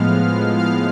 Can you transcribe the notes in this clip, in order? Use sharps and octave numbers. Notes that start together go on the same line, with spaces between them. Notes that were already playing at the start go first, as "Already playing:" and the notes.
Already playing: A2 F3 G#3 B3 F5 F6
F5 F6